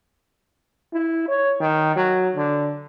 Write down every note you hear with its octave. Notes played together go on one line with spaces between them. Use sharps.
E4
C#5
D#3
F#3
D3